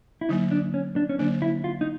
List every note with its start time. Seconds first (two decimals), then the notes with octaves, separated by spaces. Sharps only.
0.21 E4
0.29 D3 F#3 A#3 D#4
0.51 D4
0.74 C#4
0.96 D4
1.09 C#4
1.19 D3 F#3 A#3 D4
1.42 E4
1.64 F4
1.81 D#4